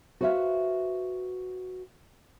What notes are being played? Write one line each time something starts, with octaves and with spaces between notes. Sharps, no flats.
F#4 B4 C5 D5 E5 F5